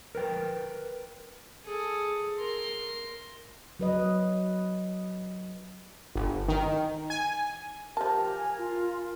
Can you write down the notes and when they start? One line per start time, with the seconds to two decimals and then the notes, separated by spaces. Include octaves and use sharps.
0.15 A#4 B4 G5
1.64 G#4 A4
2.38 A#4 C6
3.80 F#3 B4 D#5
6.15 G1
6.49 D#3
7.10 G#5
7.97 F3 G4 A#4 A5
8.37 G#5
8.58 F4